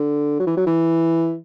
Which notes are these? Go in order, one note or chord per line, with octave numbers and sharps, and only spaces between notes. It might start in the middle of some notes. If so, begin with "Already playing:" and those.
Already playing: D3
F#3
E3
F#3
E3